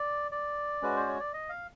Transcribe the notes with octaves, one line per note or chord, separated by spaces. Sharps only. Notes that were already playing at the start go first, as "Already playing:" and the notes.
Already playing: D5
D5
G#3 C#4 F#4 B4
C5
C#5
D5
D#5
F5